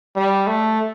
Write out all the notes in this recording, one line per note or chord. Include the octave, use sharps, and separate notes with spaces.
G3
A3